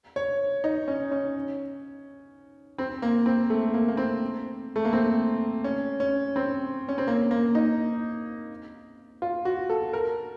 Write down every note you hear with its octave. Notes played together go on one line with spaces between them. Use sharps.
C#5
D#4
C#4
C#4
C4
A#3
C4
A3
A#3
A#3
C4
A3
A#3
C4
C#4
C#4
C4
C#4
C4
A#3
A#3
D#4
F4
F#4
A4
A#4